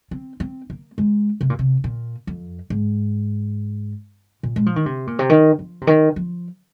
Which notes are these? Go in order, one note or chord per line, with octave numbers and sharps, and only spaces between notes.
C4
C4
A#3
G#3
C3
A#2
C3
A#2
F2
G#2
A#2
G#3
F3
D#3
C3
A#2
C3
D#3
F3
C3
D#3
F3